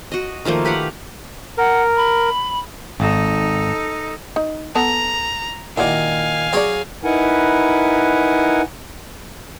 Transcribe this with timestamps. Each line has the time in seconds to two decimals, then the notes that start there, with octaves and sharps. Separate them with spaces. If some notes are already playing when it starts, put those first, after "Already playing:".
0.12 F#4 D#5
0.45 D#3 F3 A3 A#3
0.65 G4 B4 F5 F#5
1.58 A#4 F#5
1.97 B5
3.00 G#1 D#4 A4
4.36 D#4
4.75 B3 A4 A5 A#5
5.78 A#2 D#3 E4 F#4 D5 F5 G#5
6.53 F#3 C4 G#4 C#5 D5
7.04 D#4 E4 A#4 B4 F#5 G#5